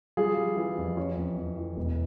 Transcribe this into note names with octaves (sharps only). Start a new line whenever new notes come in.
G3 F4 G#4
G3
E3
F2
E3 C#4
F2
F2
E3
E1